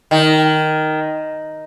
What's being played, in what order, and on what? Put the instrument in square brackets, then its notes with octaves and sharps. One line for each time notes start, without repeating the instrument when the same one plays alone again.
[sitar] D#3